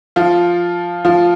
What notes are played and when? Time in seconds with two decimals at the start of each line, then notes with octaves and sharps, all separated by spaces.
0.16 F3 F4
1.05 F3 F4